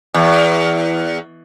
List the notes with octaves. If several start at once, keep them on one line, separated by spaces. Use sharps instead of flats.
E2